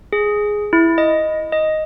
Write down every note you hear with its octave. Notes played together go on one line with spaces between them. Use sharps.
G#4
E4
D#5
D#5